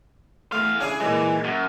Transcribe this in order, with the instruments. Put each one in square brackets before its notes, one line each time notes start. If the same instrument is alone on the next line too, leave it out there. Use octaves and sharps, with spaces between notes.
[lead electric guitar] E2 F5 [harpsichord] A3
[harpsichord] C#3 D4 E4 [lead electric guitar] G#4
[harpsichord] A#2 G#3 [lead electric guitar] E3
[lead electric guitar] F#2